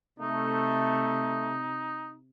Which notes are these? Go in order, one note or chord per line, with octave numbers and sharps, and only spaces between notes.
C3 A3 D#4